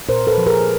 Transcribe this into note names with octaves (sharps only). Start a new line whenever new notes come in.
A#2 A#4 C5
A4 B4
F3
G#4 A#4